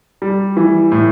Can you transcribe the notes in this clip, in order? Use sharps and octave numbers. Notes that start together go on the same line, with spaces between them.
G3
E3
A2